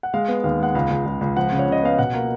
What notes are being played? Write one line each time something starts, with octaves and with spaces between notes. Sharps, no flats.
F#5
G#3 F5
B3
D#2 F5
G#3 F#5
C#2 F5
C#2
C#2
C#2
F3 F#5
C#3
C#5
C#3 D#5
B3 F5
B2 F#5
A#3